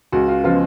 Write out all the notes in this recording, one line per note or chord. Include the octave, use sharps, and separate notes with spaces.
C#2 F#4
F4
C#3 F3 G#3 B3 F4